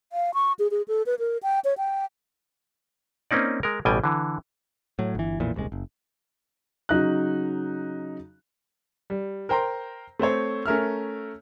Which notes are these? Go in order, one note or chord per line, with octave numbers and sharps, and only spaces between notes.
F5
C#6
G#4
G#4
A4
B4
A#4
G5
C#5
G5
A#3 C4 C#4 D#4 D5
G#3 A#4
A1 B2 G3 G5 G#5
D3 E3
A2 F#3
G1 E3
B1 F2 A#2 E3
D#1 C2 G#3
F#1
C#3 F#3 D#4 F#6
G3
A#4 C5 G5 A#5 C6
A3 C4 C5 C#5
A3 C#4 A#4 E5 F6